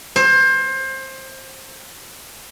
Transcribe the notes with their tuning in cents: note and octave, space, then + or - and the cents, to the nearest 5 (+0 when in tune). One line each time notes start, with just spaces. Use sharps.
C5 +25